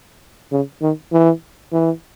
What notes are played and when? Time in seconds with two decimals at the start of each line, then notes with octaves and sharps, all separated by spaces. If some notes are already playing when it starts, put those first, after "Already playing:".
0.52 C#3
0.82 D#3
1.12 E3
1.72 E3